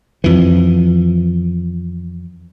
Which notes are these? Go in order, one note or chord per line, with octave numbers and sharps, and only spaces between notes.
F2 E3